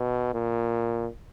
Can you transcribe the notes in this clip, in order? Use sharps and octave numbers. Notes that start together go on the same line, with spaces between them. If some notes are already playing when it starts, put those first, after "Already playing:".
Already playing: B2
A#2